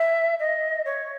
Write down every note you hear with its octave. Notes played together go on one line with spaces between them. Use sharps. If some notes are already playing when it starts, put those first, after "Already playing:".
Already playing: E5
D#5
C#5